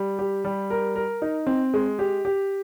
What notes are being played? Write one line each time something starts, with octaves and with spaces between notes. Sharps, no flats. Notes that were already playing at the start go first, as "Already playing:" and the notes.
Already playing: G3
G4
G3
A#4
A#4
D#4
C4
G#3
G4
G4